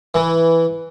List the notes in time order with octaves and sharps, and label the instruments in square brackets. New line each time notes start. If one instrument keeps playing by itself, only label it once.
[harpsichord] E3